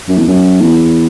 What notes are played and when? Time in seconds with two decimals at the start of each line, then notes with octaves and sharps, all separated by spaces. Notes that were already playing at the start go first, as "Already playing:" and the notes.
0.08 F#2
0.18 E2
0.28 F#2
0.61 E2